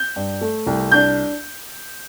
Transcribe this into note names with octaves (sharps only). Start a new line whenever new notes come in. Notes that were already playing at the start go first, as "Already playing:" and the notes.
Already playing: G6
G2
A3
C2
D4 G6